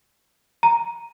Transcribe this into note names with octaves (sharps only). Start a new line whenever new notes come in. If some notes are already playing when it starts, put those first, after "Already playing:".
A#5